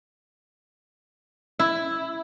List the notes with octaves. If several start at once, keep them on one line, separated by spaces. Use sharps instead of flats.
E4